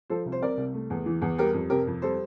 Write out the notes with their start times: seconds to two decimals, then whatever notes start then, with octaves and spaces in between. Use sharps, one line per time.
0.10 F3 A4 C5
0.26 C2
0.32 C5
0.42 C3 A#4 D5
0.57 C2
0.74 A3
0.90 E2
1.06 E3
1.22 E2
1.38 G3 G4 A#4
1.54 F2
1.70 C3 G4 A#4
1.87 F2
2.02 G3 A4 C5